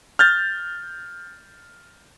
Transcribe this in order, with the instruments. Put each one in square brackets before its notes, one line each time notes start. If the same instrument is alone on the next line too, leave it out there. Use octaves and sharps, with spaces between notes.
[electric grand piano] F6 G6 A6